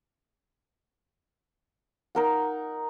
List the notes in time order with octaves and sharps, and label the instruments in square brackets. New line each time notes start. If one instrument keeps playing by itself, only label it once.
[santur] D#4 A#4 F#5